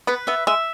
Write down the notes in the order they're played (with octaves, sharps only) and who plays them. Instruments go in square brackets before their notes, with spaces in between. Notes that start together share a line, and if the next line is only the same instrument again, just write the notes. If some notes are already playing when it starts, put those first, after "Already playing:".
[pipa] B3 [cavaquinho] B4
[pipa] B3 [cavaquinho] E5
[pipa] G#3 [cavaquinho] E5